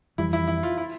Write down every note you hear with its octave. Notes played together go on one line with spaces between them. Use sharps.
F2 E3 G3 E4
E4
E4
F4
E4